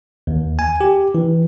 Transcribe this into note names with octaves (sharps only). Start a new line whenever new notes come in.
D#2
G#5
G4
E3